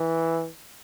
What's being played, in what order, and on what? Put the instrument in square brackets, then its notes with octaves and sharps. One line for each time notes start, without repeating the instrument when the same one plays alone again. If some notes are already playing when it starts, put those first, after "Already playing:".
Already playing: [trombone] E3